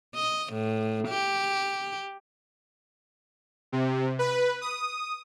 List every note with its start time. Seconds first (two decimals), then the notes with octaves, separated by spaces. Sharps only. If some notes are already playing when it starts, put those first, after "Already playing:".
0.15 D#5
0.53 A2
1.08 G4
3.72 C3
4.19 B4
4.61 D#6